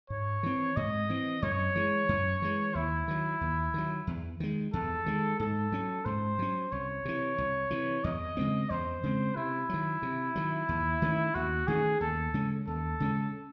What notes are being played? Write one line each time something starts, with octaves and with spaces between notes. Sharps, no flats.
G#2 C#5
E3 C4
G#2 D#5
E3 C4
F#2 C#5
E3 G#3
F#2
E3 G#3
D#2 E4
D#3 F#3
D#2
D#3 F#3
E2
D#3 G#3
E2 A4
D#3 G#3
G#2 A4
F#3 C#4
G#2 C5
F#3 C#4
C2 C#5
C3 E3
C2
C3 E3
E2 D#5
C#3 G#3 C4
E2 C5
C#3 G#3 C4
C3 E4
D#3 F#3
C3
D#3 F#3
D#2
D#3 A3 C#4
D#2 F#4
D#3 A3 C#4 G#4
D#2 A4
C#3 G#3 C#4
D#2 A4
C#3 G#3 C#4